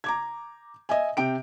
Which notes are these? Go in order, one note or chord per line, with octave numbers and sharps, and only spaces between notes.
A#5 D6 G#6
D#5 E5 G#5
C3 G5 D7